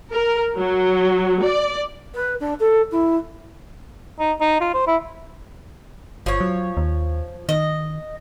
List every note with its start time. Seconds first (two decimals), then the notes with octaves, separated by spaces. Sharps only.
0.14 A#4
0.56 F#3
1.40 D5
2.14 B4
2.40 D4
2.60 A4
2.92 E4
4.19 D#4
4.41 D#4
4.61 F4
4.74 C5
4.87 E4
6.26 G1 F3 C#5
6.41 F#3
6.77 D#2
7.49 D#3 D#5